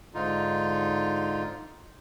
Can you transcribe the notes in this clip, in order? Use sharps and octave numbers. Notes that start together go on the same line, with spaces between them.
G#2 D3 D#4 F4